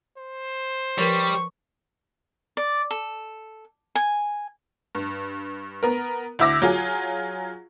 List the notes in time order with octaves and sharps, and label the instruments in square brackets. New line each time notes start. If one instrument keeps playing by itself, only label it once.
[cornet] C5
[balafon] F3 A#4 B4 [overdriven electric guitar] G3 [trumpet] C#6
[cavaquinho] D5
A4
G#5
[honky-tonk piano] G2
B3 A#4
D2 E4 E5 D6 E6 A#6
F#3 F4 G#4